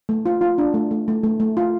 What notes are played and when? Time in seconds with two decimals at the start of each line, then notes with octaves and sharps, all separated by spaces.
0.09 A3
0.26 F4
0.41 F4
0.58 D4
0.74 A3
0.91 A3
1.08 A3
1.23 A3
1.40 A3
1.57 F4